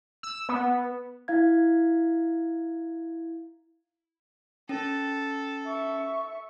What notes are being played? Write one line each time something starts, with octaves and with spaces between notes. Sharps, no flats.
E6
B3
E4 F5 G#6
C#4 A4
E5 C#6